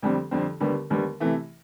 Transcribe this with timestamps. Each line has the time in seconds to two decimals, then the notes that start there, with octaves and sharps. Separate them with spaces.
0.03 F2 D3 G3 C4
0.31 F2 D3 G3 C4
0.60 D#2 D3 G3 B3
0.90 D#2 D3 G3 B3
1.20 C3 E3 A3